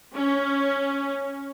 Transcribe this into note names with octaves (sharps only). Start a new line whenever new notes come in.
C#4